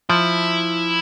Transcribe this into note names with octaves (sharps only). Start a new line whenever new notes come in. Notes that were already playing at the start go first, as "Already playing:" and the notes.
F3 E4